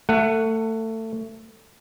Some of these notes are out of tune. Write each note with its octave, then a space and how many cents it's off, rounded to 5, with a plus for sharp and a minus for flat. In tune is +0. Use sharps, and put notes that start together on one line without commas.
A3 +25 F#5 +0